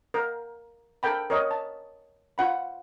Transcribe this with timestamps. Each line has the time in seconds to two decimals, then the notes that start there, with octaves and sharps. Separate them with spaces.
0.14 A#4
1.03 A4 A#4 G5 B5
1.30 A#4 C#5 D#5
1.51 A5
2.38 F4 F#5 B5